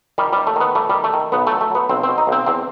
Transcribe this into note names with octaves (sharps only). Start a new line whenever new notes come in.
D#3 G3
D#2 G3
A3
D#3 B3
G3 A3
D#3 G3
A3
D#3
B1 B3
F#3 A3
A3
F#3 B3
B1 C4
B2 C4
D#4
B1 C4
E2 C4